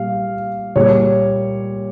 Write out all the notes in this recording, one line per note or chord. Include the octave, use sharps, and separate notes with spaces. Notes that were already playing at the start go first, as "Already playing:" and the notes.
Already playing: A#2 G3 F5
A#2 G3 C#5